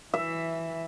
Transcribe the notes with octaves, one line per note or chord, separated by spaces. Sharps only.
E3 E5